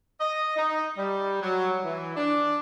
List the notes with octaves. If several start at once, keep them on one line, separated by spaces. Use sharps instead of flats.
D#5
D#4
G3
F#3
E3
D4